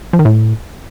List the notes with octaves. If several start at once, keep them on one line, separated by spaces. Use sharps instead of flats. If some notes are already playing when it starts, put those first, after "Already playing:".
F3
D#3
A2